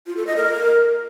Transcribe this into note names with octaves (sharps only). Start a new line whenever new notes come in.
F4
A4
D#5
A#4